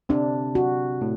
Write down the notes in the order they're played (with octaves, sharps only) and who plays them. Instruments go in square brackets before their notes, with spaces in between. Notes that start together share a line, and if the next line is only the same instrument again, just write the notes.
[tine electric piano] C3 [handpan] D4
[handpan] F#4
[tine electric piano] A2